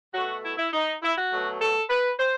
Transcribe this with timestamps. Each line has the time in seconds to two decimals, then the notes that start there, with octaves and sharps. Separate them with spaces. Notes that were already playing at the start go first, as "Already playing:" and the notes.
0.14 B2 A3 F#4
0.43 E4
0.57 E4
0.73 D#4
1.02 E4
1.17 F#4
1.32 B2 F#3 A3
1.61 A4
1.89 B4
2.19 C5